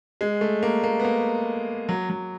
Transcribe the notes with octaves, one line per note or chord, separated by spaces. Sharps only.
G#3
A3
A#3
A#3
B3
A#3
F#3
F#3